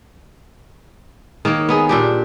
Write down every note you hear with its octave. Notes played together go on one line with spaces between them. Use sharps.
D#3 A#3 C#5
B3 D#4 G#4
A#2 D4 G4